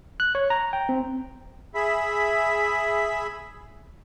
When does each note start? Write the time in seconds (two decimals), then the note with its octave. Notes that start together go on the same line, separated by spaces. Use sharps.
0.20 F#6
0.35 C#5
0.50 A#5
0.73 G5
0.89 C4
1.75 G#4 E5 B5